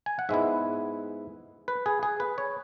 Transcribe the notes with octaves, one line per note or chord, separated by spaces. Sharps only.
G#5
F#5
G#2 G#3 B3 E4 E5
B4
G#4
G#4
B4
C#5